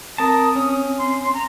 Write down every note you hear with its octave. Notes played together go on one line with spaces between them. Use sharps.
C4 A#4 A5 D#6
C#4
C6
A#5